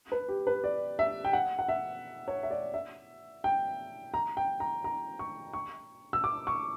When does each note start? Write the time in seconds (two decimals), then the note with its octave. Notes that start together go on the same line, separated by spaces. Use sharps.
0.12 B4
0.28 G4
0.47 B4
0.64 D5
0.99 E5
1.25 G5
1.33 F#5
1.59 F#5
1.68 E5
2.28 C#5
2.43 E5
2.50 D5
2.74 E5
3.44 G5
4.14 A#5
4.37 G5
4.60 A#5
4.84 A#5
5.19 C#6
5.53 C#6
6.13 E6
6.24 D6
6.47 C#6